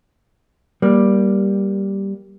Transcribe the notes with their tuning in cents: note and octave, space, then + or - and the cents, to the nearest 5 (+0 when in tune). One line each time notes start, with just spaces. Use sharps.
G3 +0 A#3 +20